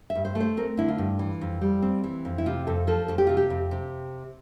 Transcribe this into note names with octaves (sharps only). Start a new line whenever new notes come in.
E5
G2
C5
A3
C5
C4 A#4
D3 E4
F4
G2
E3
F2
G3
C4
E3
F2
E4
C3 F4
F2 A4
F3 A4
F2 A4
G4
C3 F4
G4
F2
C3